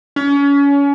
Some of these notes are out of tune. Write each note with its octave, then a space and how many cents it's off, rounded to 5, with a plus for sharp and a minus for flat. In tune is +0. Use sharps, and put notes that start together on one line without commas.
C#4 +30